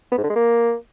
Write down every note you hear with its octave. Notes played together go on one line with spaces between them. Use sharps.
B3
G#2
D3
G#3
A#3